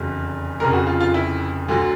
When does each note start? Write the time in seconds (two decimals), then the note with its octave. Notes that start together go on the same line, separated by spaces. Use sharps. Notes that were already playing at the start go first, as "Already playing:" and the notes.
Already playing: F1 E2 C#3 F#3
0.60 F1 F2 C#3 A#4
0.73 F#4
0.87 F4
1.00 F4
1.14 E4
1.68 D2 D3 F#3